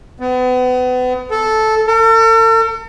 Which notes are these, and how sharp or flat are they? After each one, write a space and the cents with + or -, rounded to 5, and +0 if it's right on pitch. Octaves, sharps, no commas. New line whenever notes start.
B3 +35
A4 -10
A4 +45